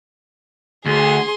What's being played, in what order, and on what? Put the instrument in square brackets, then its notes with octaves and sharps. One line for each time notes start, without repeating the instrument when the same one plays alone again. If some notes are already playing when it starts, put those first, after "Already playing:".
[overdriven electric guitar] D2 [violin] G#4 C6